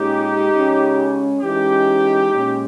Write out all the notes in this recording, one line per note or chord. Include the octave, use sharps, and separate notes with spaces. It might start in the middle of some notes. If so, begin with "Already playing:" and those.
Already playing: A#2 G#3 C#4 D#4 G4
C#3 G#3 C#4
E3 G#3 C#4 D#4 G4
A#2 G#3 C#4